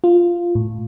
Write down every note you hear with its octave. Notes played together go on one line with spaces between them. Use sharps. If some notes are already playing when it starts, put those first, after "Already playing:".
F4
A2